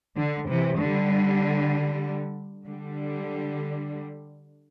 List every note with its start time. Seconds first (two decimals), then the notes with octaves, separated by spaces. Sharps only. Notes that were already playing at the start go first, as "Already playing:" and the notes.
0.17 D3
0.48 C3 E3
0.79 D3 G3
2.66 D3 G3